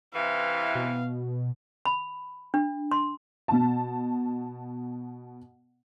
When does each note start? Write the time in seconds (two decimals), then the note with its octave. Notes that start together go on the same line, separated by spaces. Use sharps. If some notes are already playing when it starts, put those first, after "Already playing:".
0.14 C3 E3 F5
0.75 B2
1.86 B5
2.54 D4
2.91 C6
3.48 B2 A5